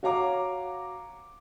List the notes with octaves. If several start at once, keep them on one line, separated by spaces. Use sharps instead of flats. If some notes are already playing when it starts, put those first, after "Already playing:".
F#4 C#5 F5 A#5 D6